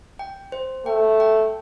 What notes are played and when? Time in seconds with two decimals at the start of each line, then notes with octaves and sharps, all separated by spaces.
0.19 G5
0.52 C5
0.86 A3 G5
1.20 G5